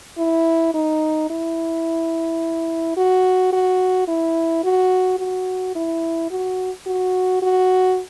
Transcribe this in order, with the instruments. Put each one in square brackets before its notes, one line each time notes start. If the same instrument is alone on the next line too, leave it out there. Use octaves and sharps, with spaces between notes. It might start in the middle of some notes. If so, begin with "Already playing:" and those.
[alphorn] E4
D#4
E4
F#4
F#4
E4
F#4
F#4
E4
F#4
F#4
F#4